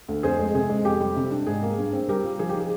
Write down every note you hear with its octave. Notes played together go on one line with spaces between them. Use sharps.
D2
F2 G#4 C5
G#3
C3 G#4
G#3
F2 G4
G3
C3
D4
G#2 G#4
A#3
G2
C4
G3 G4 A#4
F4
F3 G#4
G4
D#4
G#4